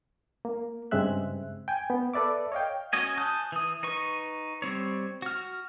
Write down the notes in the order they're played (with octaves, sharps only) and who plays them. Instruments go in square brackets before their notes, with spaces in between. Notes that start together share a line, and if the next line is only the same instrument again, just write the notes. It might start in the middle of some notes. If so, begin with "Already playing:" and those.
[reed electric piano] A#3
G2 C#3 G#3 C4 E5 F#6
G5 G#5
B3
A4 B4 D5 E5 D6
C#5 D#5 F5 G5
[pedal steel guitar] C#4 F#4 C#5 D#5 G#5
G#5 A5 D#6 F#6 G6
E3 D#6
D#4 B4 C#6
G3 C4 C#5
F#4 F6